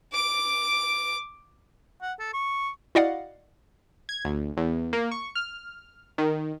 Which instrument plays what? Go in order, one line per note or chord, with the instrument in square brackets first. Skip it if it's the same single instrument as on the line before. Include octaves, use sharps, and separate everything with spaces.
[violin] D6 D7
[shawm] F#5
A4
C#6
[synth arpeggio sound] E4 F#4 D5 D#5 F5 F#5
[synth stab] G#6
D2
E2
A#3
C#6
F6
D#3